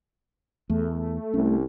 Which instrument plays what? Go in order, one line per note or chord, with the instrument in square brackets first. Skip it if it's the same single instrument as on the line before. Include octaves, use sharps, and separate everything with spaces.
[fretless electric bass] E2 [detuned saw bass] A3
[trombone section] C2 [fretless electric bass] C#4